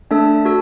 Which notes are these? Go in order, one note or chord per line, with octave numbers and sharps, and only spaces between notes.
A3 D4 A4 E5 A5
F#4 A4